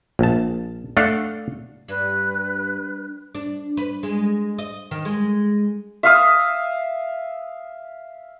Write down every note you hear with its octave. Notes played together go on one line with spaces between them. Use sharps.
A#1 A5
A3 D4 A4 F5 F#5
G2 B4
D4
B4
G#3
D#5
D#3
G#3
E5 F5 D#6